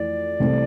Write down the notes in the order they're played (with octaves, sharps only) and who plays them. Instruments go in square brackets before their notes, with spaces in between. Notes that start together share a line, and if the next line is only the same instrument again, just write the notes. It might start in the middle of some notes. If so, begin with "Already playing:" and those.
Already playing: [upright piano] F2 E3 A3 [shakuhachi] D5
[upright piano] C2 C3 E3 A3 C4